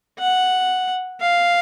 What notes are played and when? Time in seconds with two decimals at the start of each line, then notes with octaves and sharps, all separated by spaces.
0.19 F#5
1.20 F5